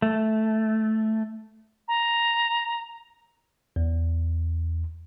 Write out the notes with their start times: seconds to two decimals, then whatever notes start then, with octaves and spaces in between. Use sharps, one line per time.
0.02 A3
1.88 A#5
3.76 E2